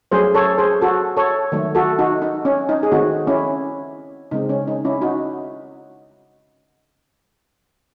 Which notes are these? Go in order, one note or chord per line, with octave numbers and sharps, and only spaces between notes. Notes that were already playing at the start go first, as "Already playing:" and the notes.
F#3 A3 C#4 G#4 C5
A4 C#5
G#4 C5
F#4 A4
A4 C#5
D#3 F#3 A3
F#4 A4
D#4 F#4
D#4
C#4
D#4
G#4
D#3 A3 C4 D#4 F#4
C#4 E4
C#3 G#3 C4 D#4
C#4
D#4
C#4 E4
D#4 F#4